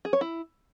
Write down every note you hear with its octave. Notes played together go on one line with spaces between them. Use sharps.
G#4
C#5
E4